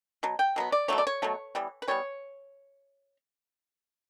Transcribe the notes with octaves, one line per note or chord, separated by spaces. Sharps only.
B2 F#3
G5
B2 F#3 B3
D5
B2 F#3 A3 C#5
D5
C#5
B2 F#3 A3
E3 G3 B3
B4
E3 G3 B3 C#5